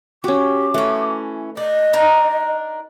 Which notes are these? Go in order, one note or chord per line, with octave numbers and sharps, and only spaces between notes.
C#4 F#4 G4 D6
E3 A3 C#4
D4 D#5
D4 D#4 A#4